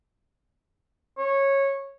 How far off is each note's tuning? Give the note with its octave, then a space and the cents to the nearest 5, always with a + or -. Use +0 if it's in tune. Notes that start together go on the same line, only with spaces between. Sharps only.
C#5 -15